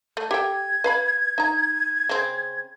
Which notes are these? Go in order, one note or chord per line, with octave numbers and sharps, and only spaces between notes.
A3
G4 A4 G5 G#6
B4 F5 B5
D#4 A#5
C#3 C4